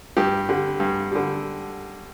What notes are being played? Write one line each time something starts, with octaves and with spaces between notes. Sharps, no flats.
G2 G4
D3 G3
G2
D3 G3